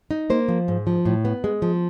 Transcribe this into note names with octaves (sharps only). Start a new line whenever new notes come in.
D#4
A#3 C5
F3
G#2
F3
A2
B3
G#3
F3